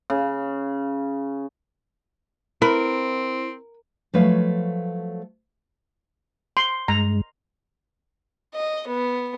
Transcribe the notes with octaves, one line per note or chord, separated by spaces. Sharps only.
C#3
C4 E4 A#4 B4 B5
F3 F#3 A3 B4 C#5 F5
C6
G2 G#3 A#5
D#5
B3